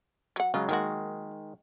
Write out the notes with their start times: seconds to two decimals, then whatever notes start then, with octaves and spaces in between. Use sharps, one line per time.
0.36 F#3 F#5
0.54 C#3 F#3 G#3 F4
0.69 D#3 F#3 G#3 A#3 F#4